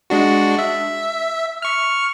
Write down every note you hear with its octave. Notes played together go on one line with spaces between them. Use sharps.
G#3 D4 F#4
E5
C#6 F6